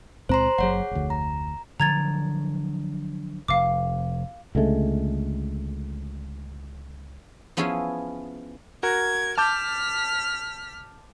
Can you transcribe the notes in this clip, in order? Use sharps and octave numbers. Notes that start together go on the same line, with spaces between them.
C#2 A#2 C4 C5 A#5 C6
F#1 F#3 G#4 C#5 F#5
F1 D2
A#5
D3 F3 F#3 A#5 G#6 A6
F1 F5 D6
C#2 D3 G#3 A3
F3 B3 C#4 E4 G#4
F#4 A#4 G#6
A5 D6 F6 G6 B6